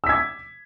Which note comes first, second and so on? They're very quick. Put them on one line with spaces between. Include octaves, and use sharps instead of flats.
E6 B6 G#6 D6